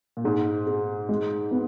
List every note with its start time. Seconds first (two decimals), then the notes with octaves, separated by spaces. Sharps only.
0.17 A#2
0.24 G#2 G#4
0.66 G#4
1.09 G#3
1.51 B3